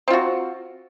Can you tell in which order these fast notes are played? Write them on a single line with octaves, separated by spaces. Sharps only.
C4 F4 F#4